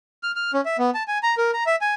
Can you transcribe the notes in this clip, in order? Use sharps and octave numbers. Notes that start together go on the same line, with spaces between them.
F6
F6
C#4
E5
B3
A5
G#5
A#5
A#4
A#5
E5
G#5